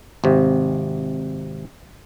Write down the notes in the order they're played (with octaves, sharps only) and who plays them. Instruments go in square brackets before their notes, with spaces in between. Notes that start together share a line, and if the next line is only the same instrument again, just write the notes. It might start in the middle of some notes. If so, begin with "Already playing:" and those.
[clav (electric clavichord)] G#1 C3